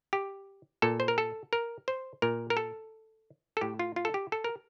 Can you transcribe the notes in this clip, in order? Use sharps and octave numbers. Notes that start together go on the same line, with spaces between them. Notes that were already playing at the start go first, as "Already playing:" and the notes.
G4
A#2 A4
C5
A#4
A4
A#4
C5
A#2 A#4
A#4
A4
A4
A2 G4
F4
F4
A4
G4
A4
A#4